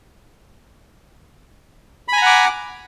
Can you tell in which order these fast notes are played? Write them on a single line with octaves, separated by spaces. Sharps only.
B5 G#5 A#5 F#5 D6